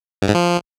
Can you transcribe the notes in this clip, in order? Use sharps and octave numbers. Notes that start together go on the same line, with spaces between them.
G2
G#2
F3